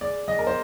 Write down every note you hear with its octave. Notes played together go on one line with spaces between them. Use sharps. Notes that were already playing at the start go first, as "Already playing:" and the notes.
G#3 D5
G#3 D#5
A#4
C5